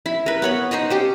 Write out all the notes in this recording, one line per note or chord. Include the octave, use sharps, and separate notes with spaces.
E4
A#4 B4
B3 C#5 B5
D#4 C5 C#5 D#5
C#4 G4 C5